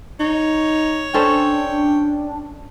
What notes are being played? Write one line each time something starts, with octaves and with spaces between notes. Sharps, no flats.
D#4 C#5
C#4 D4 A4 C5 G5